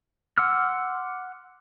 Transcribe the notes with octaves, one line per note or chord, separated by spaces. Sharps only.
F#5 C6 D6 E6 F6